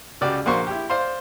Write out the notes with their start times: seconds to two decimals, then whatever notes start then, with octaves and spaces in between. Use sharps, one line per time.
0.21 C#2 F#4 G4 D5 F6
0.46 A#1 A#3 F#4 C5 C6 C#6
0.67 E4 G4
0.90 C5 D5 F5 C6